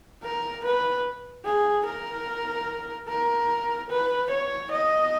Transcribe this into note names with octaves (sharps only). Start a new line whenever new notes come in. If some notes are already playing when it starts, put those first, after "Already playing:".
A#4
B4
G#4
A#4
A#4
B4
C#5
D#5